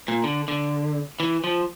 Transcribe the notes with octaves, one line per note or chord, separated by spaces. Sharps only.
A#2
D3
D3
E3
F3